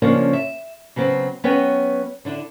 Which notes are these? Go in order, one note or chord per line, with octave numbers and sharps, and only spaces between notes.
C#3 F3 A#3 C#4 D4
E5
C#3 F#3 B3 C4
F#3 B3 C#4 G#4 B4 G5
D3 D4 E4